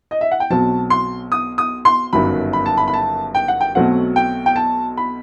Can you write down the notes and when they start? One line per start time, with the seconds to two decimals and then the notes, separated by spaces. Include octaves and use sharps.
0.11 D#5
0.21 E5
0.31 F#5
0.40 G5
0.50 B1 B2 F#3 C4 A5
0.90 C6
1.32 D#6
1.58 D#6
1.85 C6
2.13 G1 F#2 D#3 F#3 B5
2.53 B5
2.66 A5
2.77 B5
2.88 B5
2.94 A5
3.35 G5
3.48 F#5
3.61 G5
3.75 B1 B2 F#3 A3 C4 F#5
4.16 G5
4.46 G5
4.56 A5
4.97 B5